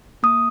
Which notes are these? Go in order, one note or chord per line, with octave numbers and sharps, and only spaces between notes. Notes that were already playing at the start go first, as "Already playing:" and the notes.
A#3 D#6